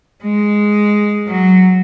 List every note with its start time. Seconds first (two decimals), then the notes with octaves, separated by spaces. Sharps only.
0.23 G#3
1.28 F#3